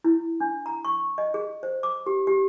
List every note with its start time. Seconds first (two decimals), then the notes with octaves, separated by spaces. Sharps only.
0.05 E4
0.40 D4
0.66 A#5
0.85 C#6
1.18 D#5
1.34 G#4
1.63 C5
1.83 D6
2.06 G4
2.27 G4